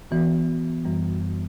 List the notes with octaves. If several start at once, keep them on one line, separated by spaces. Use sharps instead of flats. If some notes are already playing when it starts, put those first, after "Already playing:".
E3 B3 F#4
F#2 E3 G3